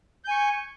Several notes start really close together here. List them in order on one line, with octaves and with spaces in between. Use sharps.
G6 G#5 C#6